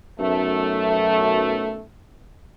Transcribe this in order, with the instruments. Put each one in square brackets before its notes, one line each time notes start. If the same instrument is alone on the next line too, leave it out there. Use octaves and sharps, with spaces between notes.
[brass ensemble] B1 F#2 A3